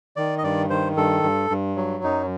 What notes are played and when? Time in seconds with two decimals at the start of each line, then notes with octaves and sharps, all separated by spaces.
0.16 D#3 D5
0.38 D#5
0.43 G2 D5
0.70 D#3 C5
0.97 G2 A4
1.23 G2
1.50 G2
1.77 F#3
2.04 F#2 D#4